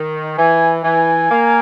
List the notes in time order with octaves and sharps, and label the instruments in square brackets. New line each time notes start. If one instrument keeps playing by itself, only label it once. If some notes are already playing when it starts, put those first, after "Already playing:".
Already playing: [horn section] D#3
[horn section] E3 [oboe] G#5
[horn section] E3 [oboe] G#5
[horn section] A#3